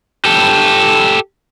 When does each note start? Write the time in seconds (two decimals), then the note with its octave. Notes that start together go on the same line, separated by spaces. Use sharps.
0.25 G4 A4